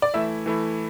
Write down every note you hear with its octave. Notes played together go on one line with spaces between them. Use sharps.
D5
E3 A3 E4 E5
E3 A3 E4